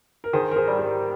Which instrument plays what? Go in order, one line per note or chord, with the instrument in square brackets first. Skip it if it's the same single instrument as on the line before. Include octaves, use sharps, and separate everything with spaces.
[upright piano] A#4
[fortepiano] D#3 [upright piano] G#4 C5
[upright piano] A#4
G#4 C5
[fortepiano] G3
[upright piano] G4 A#4